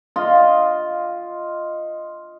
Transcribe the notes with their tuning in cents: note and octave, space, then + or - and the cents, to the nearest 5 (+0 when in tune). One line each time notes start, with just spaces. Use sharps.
F4 +0 D#5 +0